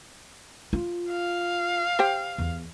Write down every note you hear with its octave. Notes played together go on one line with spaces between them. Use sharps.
F4
F5
G4 C5 G5
E2